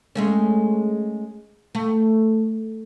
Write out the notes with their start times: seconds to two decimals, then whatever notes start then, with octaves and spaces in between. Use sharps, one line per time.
0.15 G#3 A3 C#4
1.75 A3